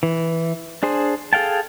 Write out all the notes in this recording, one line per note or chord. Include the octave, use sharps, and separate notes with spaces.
E3
D4 G#4 C5
G#4 A4 F5 G5 A5